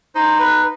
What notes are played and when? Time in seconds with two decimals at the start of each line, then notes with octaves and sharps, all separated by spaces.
0.15 D#4 C5
0.39 B4